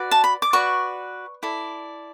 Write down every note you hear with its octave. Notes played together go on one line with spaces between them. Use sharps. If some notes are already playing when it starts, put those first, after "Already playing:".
Already playing: F#4 B4 D5
A5
B5
D6
F#4 B4 D5 C#6
E4 A4 D5